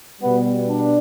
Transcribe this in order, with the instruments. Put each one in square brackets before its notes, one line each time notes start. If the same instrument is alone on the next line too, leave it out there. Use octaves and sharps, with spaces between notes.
[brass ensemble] B2 G3 B3
D4